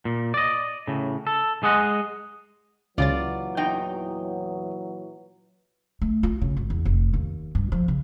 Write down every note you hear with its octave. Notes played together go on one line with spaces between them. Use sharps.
A#2
D5 D#5
A2 C#3
A4
G#3 G#4 D#5 F#5
C#2 A#2 C#3 E3 F#3 F4 D5 A6
E2 D#4 G5
A3
F4
C#3
G#1
E2
F1
D#2
G2
F3
C#3